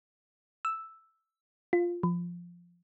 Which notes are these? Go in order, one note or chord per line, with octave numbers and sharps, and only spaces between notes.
E6
F4
F3